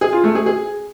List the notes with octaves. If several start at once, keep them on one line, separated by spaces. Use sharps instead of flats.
G#4
F4
A3
G#4
G#4